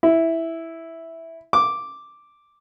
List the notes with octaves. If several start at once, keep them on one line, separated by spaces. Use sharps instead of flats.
E4
D6